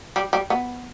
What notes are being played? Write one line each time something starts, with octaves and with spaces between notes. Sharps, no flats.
G3
G3
B3